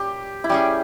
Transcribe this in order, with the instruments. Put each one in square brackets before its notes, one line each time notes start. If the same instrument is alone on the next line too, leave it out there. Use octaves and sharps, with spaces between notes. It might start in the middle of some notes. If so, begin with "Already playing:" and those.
Already playing: [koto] A#2 G3 C#4 [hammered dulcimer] G4
[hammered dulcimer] E4
[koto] G3 C#4 G#4 [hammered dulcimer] G4